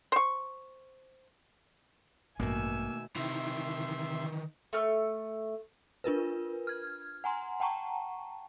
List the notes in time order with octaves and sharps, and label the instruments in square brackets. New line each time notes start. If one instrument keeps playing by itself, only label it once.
[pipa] C5 C#6
[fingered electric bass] A1 G2 [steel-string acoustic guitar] B2 D#3 A3 [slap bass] A#3 [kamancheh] G#5 E6
[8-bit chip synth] C3 E5 C6 [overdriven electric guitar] D#3 E3
[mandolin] A3 F6
[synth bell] D4 F4 A#4 B4
F6 G#6
F#5 G#5 A#5 C6
F#5 G5 A5 A#5 C#6